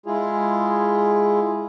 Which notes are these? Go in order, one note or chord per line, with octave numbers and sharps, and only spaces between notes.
G#3 E4 F4 G#4